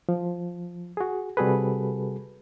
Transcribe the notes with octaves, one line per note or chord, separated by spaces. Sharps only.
F3
F#4 G#4
C3 G3 F#4 G#4 A4 B4